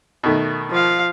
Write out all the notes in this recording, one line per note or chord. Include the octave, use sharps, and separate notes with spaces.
B2 D#3 A3
F3 F5